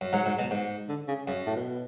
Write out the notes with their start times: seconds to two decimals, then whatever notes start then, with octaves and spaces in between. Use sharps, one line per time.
0.01 F#2
0.13 G#2 F#3
0.26 G#2
0.39 B2
0.51 G#2
0.89 D3
1.08 C#3
1.27 F#2 C#3
1.46 A2
1.56 B2